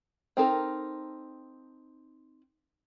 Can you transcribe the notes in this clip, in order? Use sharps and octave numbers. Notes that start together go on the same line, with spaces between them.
C4 D#4 A4 A#4